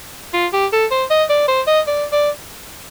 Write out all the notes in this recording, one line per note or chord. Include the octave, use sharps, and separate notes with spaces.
F4
G4
A4
C5
D#5
D5
C5
D#5
D5
D5